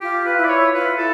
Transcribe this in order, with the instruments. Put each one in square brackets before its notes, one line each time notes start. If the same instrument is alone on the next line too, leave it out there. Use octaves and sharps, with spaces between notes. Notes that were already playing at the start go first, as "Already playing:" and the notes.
[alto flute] F4 [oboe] G4
[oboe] B4
[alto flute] E4
[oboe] D5
C#5
[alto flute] F4 [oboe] B4
[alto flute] E4 [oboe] A4